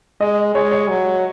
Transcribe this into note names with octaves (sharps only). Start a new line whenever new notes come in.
G#3 D#5
G#3 C#5
C#5
F#3